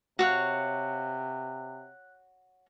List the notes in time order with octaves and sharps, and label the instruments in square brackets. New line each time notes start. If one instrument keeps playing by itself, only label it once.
[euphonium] C3 [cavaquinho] F#4 C#5 F5 [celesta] F#6 F#7